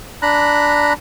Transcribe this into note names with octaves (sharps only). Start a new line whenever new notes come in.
D4 A#5 B5 F#6